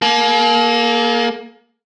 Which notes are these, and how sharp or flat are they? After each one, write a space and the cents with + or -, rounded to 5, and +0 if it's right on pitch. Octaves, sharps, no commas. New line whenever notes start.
A#3 +15 A4 -45